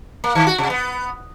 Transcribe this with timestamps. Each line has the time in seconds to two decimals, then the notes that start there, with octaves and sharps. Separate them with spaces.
0.24 A#3
0.35 D#3
0.47 F#4
0.58 C3
0.70 B3